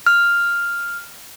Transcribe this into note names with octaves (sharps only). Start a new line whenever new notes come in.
F6